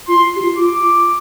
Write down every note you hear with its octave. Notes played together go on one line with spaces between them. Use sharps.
F4 C6
G4
F4
F4 D6